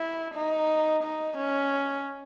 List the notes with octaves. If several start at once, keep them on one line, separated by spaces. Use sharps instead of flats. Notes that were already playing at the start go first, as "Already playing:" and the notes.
Already playing: E4
D#4
D#4
C#4